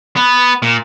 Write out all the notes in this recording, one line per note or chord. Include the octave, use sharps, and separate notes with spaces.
B3
A#2